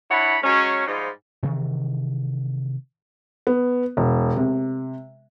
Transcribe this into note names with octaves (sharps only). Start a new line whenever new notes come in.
D4 E4 C#5 F#5 B5
F#3 G#3 C#4
G#2 F3 G3 D#4 F4
C3 D#3 E3
B3
E1
C3